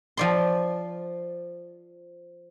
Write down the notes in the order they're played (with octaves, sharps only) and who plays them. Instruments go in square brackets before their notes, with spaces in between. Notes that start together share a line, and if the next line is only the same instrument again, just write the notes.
[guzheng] F3 D5 C6